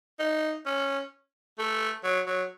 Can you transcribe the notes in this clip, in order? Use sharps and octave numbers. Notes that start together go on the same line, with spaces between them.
D#4
C#4
A3
F#3
F#3